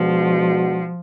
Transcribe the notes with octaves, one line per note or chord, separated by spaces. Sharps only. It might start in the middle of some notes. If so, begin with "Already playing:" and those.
Already playing: B2 F3 G#3 D4 F#4